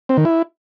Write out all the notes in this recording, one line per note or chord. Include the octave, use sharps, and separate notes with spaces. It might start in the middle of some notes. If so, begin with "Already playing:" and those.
C4
D#3
E4